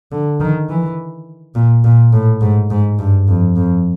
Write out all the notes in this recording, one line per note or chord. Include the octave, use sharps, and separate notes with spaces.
D3
D#3
E3
A#2
A#2
A2
G#2
G#2
G2
F2
F2